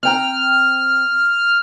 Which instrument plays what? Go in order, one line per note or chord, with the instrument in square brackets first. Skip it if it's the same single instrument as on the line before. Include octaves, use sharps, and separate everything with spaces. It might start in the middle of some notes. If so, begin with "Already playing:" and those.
[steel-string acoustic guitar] C4 G5 A#5 [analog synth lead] F6